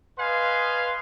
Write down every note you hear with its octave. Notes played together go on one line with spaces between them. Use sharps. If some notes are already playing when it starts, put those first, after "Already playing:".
B4 D#5 F5 G#5 C6